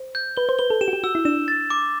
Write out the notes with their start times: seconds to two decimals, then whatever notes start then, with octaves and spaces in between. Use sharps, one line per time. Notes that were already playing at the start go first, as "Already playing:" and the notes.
Already playing: C5
0.15 G6
0.37 B4 G7
0.49 C5
0.59 B4 G7
0.70 A4
0.81 G4 E7
0.88 F#4
0.93 G4
1.04 F#4 E6
1.15 E4
1.25 D4 E7
1.48 A6
1.70 D6